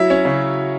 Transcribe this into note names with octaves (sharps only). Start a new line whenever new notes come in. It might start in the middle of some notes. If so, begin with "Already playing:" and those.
Already playing: F#3 E4 E5
C#4
C#3